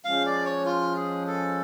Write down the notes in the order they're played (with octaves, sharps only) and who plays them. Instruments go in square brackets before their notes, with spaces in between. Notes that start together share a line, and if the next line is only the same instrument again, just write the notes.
[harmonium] F3 G#3 C#4 [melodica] F5
[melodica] D5
C#5
F4
G#4
A4